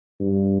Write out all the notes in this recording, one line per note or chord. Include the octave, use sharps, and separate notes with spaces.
G2